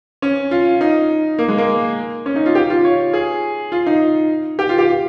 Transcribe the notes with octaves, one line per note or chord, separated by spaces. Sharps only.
C#4
F4
D#4
A#3
G#3
A#3
C#4
D#4
F4
G4
F4
C#5
G#4
F4
D#4
G4
F4
G4